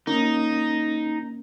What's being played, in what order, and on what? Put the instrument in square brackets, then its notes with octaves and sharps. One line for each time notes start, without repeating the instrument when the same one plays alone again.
[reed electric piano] A#3 C#4 [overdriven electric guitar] D#4